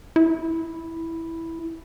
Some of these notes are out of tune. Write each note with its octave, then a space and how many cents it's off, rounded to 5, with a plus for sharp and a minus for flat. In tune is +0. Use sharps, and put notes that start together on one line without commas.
E4 -5